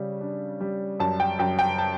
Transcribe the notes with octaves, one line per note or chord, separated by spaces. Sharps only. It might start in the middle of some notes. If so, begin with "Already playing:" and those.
Already playing: C#3 G3
D4
G3
F#2 A5
G5
F#2 G5
G5
A5